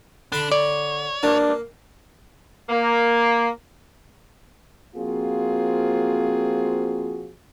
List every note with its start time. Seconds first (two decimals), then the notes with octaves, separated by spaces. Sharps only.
0.32 D3 D4 B5 C6
0.52 C#5 D5
1.23 A#3 D4
2.69 A#3
4.96 F3 A#3 C4 F4 F#4 G#4